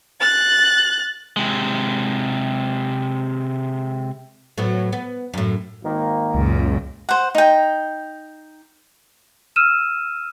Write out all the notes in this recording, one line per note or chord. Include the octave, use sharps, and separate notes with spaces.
F#6 A6
C3 G#3
A2 F#3 B3
B3
F#2 A2
G#1 D#3 A#3
C#2 F#2 A#2
C5 F#5
D#4 G5
E6 F6 D#7 E7